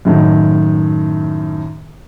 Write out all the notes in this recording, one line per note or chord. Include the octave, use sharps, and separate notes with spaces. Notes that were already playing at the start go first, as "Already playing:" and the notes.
F#2 A2 D#3 F#3